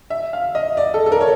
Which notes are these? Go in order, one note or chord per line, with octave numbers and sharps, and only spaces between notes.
E5
F5
D#5
D5
A4
A4
A#4
C#5